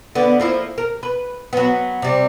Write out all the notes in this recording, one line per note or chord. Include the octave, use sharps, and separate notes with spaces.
D3 B3
F3 A#3 E4
A#4
B4
F#3 B3
C3 G3